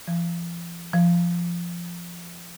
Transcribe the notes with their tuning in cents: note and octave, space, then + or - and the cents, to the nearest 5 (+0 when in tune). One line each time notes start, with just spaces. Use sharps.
F3 -40
F3 -15